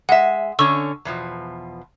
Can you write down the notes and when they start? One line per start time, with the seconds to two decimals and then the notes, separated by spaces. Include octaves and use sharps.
0.09 G#3 E5 F#5
0.59 D3 C#4 C#6 E6
1.05 E2 B2 F3